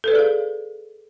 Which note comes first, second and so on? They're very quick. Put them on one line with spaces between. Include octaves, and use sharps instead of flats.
A4 B4 D5 G#4 F5